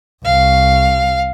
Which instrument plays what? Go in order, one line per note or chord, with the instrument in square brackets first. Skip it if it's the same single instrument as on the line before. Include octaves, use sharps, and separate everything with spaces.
[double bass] C2 [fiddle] F5